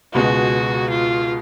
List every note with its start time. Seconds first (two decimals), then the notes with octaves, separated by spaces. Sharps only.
0.14 C#2 B2 G#3 F#4
0.90 F4